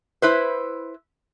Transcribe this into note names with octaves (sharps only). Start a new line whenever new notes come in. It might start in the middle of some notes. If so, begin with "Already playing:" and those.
E4 B4 C5